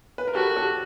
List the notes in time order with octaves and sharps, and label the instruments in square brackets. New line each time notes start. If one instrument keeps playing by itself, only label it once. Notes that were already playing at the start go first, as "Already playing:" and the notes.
[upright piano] B4
A#4
[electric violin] F#4 [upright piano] G4 A4
[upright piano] G4 A4